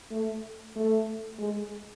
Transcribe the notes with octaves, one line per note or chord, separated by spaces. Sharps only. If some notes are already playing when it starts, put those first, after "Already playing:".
A3
A3
G#3